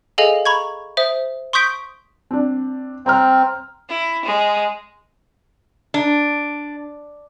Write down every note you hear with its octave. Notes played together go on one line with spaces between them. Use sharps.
G#4 A4 D#5 F5 G#5
A#5 B5 C#6 G#6
C5 E5 D#6
C6 C#6 D#6 G6 B6 D7
C4 D4
C4 G5 A#5 F6
E4
G#3
D4